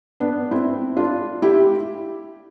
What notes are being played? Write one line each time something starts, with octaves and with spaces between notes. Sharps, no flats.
B3 D4
C4 E4
D4 F4
E4 G4